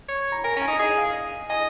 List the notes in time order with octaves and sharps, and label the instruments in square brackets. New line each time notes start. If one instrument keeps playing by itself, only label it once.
[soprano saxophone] C#5
[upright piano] A#5
[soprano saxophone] A#4 [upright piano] G#5
[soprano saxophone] C#4
[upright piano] G#5
[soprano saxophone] D#4
[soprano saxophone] G#4 [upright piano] D#5
[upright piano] F5
[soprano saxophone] D#5 [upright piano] G#5